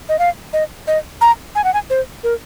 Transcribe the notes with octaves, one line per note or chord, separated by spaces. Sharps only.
D#5
F5
D#5
D#5
A#5
G#5
F#5
G#5
C5
A#4